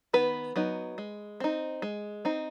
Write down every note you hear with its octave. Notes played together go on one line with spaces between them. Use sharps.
D#3 B3 B4
F#3 B3 D#4
G#3
C4 D#4
G#3
C4 D#4